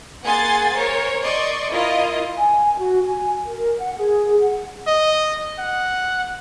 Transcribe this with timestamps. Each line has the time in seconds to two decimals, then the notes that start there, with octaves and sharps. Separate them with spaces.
0.23 A#3 G#4 F#5 G#5 C6 A6
0.76 A#4 C5 C#5
1.23 D5 D#5 C6 C#6
1.70 E4 F4 A#4 D#5
2.38 G#5
2.78 F#4
3.03 G#5
3.46 A#4
3.79 F#5
3.97 G#4
4.39 F#5
4.87 D#5
5.59 F#5